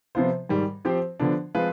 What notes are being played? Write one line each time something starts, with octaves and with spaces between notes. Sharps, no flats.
C3 F3 B3 F4 C5
G#2 D#3 G3
F3 C4 G4 C5
D3 F3 B3 D4
F3 G#3 C4 F4 B4